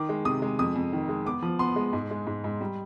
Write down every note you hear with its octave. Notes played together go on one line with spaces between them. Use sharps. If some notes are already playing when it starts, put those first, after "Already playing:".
Already playing: D#3 D6
G#3
C3 D#6
G#3
F2 D#6
F2
D#3
G#3
B3 D6
F3
B3 C6
G#3
G#2
G#3
G#2
G#2
G3